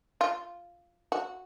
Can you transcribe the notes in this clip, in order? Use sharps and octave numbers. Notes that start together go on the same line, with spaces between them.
F4
F#4